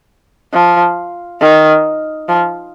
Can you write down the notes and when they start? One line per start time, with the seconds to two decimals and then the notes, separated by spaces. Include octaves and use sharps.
0.53 F3
1.41 D#3
2.29 F3